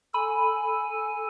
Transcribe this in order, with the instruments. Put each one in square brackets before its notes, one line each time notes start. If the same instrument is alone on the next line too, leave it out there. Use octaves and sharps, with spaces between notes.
[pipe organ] A4 G#5 [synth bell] B5